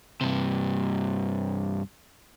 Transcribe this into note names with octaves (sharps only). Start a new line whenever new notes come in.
G2 C3